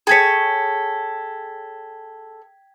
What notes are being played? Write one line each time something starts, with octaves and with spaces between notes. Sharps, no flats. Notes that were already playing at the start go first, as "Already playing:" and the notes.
G#4 A4 C#5 G5 G#6 B6